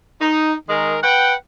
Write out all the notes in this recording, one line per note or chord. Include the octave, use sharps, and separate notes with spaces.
D#4
D#3 G#3 G#4 A#4
B4 F#5 G5